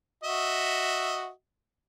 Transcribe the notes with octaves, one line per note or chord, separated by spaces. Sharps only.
F#4 D#5 E5